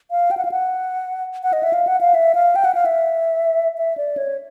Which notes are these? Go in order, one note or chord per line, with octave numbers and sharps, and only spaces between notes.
F5
G5
F#5
F5
F#5
F#5
D#5
E5
F5
F#5
F5
E5
F5
G5
F#5
F5
E5
E5
D5
C#5